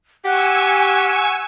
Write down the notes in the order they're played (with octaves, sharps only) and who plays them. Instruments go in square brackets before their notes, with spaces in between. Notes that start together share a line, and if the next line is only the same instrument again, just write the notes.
[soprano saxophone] G4 [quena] F#5 [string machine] G#5 C#6 E6